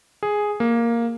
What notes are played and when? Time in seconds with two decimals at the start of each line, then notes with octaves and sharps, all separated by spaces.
0.23 G#4
0.60 A#3